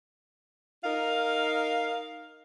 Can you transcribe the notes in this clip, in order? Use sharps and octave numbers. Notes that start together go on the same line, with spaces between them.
D#4 A#4 F5